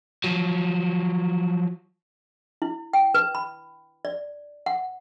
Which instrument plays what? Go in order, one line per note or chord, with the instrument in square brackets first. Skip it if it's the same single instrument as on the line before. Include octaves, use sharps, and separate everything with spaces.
[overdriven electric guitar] F3 F#3
[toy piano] E4
G5
B4
B5
D5
F#5